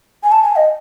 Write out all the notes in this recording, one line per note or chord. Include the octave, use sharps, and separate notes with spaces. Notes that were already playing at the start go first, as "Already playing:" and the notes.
G#5
A5
G#5
D#5